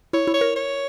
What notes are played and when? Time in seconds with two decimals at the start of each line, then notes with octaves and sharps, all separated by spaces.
0.13 E4 C#5
0.27 E4
0.34 C#5
0.41 A#4
0.56 C#5